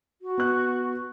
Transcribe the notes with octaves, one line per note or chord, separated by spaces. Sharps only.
F#4
B3 F#6